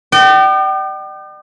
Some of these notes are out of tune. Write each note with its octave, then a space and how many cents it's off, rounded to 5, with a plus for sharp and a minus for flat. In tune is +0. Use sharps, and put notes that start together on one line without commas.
D5 +45 G5 -35